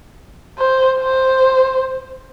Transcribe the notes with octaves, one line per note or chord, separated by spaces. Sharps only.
C5
C5